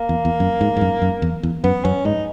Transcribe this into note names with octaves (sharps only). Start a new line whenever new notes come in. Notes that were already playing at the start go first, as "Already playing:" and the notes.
Already playing: A#3
E2
E2
F#2
G#2
G#2
F#2
F#2
E2
E2
F#2 B3
F#2 C#4
G#2 D#4